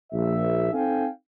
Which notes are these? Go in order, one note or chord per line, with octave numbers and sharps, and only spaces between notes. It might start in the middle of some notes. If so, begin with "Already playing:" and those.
A#1 E5
C4 D#4 A4 F5 G5 G#5